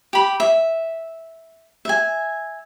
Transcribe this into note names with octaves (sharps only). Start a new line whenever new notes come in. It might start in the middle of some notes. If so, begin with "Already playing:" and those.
G4 B5
E5
E5 G#5